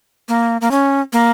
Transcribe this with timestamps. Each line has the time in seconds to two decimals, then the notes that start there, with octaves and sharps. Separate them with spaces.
0.29 A#3
0.61 A#3
0.71 C#4
1.13 A#3